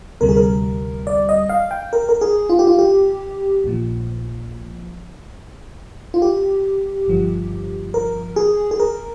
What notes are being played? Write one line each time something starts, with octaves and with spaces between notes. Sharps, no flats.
D2 C3 G3 A#4
G#4
A#4
D5
D#5
F5
G5
A#4
A#4
G#4
F4
G4
F4
G4
A#1 A#2 F3
F4
G4
G1 G2 F3
A#4
G#4
G#4
A#4